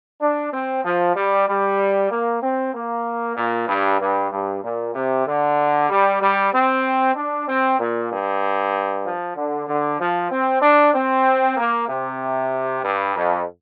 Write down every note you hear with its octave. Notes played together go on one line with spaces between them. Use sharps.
D4
C4
F3
G3
G3
A#3
C4
A#3
A#2
G2
G2
G2
A#2
C3
D3
G3
G3
C4
D4
C4
A#2
G2
F3
D3
D3
F3
C4
D4
C4
A#3
C3
G2
F2